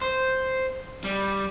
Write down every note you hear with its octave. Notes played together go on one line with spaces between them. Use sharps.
C5
G3